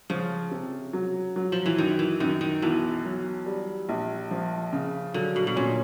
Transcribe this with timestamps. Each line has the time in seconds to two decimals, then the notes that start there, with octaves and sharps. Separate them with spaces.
0.10 C#3 F3
0.51 C3
0.93 F#3
1.36 F#3
1.52 F3
1.66 E3
1.78 F#2 D#3
1.99 E3
2.20 F#2 D#3
2.41 D#3
2.62 B1 E3
3.04 F#3
3.46 G3
3.89 A#1
4.31 F3
4.72 C#3
5.14 D3 F#3
5.36 B2
5.47 B2
5.56 A#2 C#4